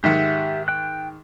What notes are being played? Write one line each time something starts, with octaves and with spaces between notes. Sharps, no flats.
G#2 D#3 G4 E5 F#5
G5 F#6